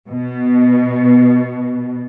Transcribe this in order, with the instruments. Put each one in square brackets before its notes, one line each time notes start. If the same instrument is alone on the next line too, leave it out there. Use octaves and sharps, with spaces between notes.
[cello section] B2